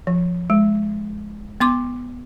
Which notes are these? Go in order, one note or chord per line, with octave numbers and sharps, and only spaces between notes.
F3
G#3
B3 C6 D6